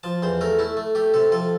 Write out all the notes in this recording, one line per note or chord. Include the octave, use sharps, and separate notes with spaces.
F3 A5
E2 C5
A3 A#4
A3 E4
A3
A3 G4
C3 A4
F3 A4